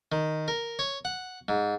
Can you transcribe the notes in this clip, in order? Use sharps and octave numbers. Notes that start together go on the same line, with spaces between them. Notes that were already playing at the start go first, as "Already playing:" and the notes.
D#3
A#4
C#5
F#5
G#2